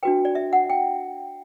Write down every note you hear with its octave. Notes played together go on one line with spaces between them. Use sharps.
D4 F#4 B4 G5
D5
E5
F#5
G5